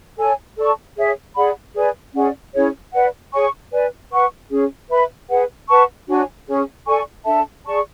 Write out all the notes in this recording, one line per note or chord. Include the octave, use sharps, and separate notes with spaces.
A4 C#5 G#5
A4 D5 A5 C#6
G#4 C#5 E5
G#4 D5 F#5 B5
G#4 B4 D5 G#5
C#4 G#4 D5 F#5
C#4 E4 G#4 C#5
B4 D5 F#5
G#4 C#5 G#5 C#6
B4 D5 G#5
B4 F#5 C#6
C#4 G#4 C#5
B4 E5 B5
G#4 B4 F#5
B4 F#5 A5 C#6
D4 F#4 C#5 G#5
C#4 G#4 C#5
A4 D5 G#5 C#6
D4 A4 E5 A5
G#4 D5 A5 C#6